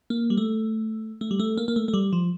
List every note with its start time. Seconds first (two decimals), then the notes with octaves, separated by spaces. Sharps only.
0.10 A#3
0.30 G3
0.37 A3
1.21 A3
1.31 G3
1.40 A3
1.58 A#3
1.68 A#3
1.76 A3
1.88 A3
1.94 G3
2.13 F3